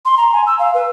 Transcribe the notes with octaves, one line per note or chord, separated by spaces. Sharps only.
C6
A#5
G#5
E6
F5
B4